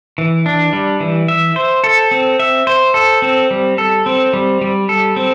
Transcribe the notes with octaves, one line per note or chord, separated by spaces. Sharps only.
E3
D4
G3
E3
E5
C5
A4
C4
E5
C5
A4
C4
G3
A4
C4
G3
G3
A4
C4